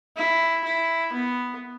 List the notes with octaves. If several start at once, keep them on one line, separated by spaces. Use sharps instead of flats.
E4
E4
B3